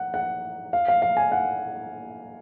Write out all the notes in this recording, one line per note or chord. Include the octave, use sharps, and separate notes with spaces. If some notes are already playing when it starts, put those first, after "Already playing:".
Already playing: F#5
F#5
F5
F5
F5
G#5
F#5